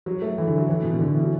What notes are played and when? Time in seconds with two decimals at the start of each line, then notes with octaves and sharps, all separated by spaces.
0.06 F#3
0.22 A3
0.38 E3
0.47 D3
0.58 F#3
0.68 E3
0.83 B2
0.94 B2
0.99 D3
1.13 E3
1.23 F#3